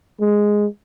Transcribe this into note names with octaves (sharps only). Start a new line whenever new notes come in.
G#3